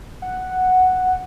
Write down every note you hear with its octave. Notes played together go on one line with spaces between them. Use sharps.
F#5